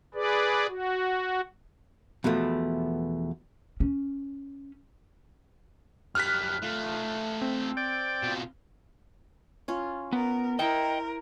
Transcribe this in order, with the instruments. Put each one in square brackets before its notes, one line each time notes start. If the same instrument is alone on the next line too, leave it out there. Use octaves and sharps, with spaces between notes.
[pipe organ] G#4 B4 D5
F#4
[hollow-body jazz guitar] E2 B2 F3 A3
[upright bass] C#4
[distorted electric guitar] F#2 G3 [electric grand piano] F6 F#6 B6
[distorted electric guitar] A3 F4
[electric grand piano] C4
[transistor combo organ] D5 G5
[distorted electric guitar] B2 F4
[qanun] C#4 F4
[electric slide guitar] B3 [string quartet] A#4
[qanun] E4 C5 [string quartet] A#4 [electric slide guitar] D#5 G5